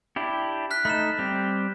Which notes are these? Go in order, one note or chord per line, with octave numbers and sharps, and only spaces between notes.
D4 E4 G4
F6 F#6 B6
A3 D#4 B5 F6 E7
G3 C4 G4